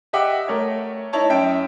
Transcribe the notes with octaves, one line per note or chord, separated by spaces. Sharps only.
G4 D#5 E5 F#5 G5 D6
A3 A#4 C#5
D#4 E4 C#5 A5
F#2 E5 G5 D7